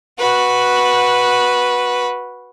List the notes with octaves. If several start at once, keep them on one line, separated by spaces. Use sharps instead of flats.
F#4 B4